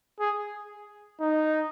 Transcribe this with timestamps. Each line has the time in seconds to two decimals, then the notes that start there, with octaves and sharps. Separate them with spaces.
0.20 G#4
1.21 D#4